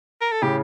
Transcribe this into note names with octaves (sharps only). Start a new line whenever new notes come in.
A#4
A4
A2 C#3 G4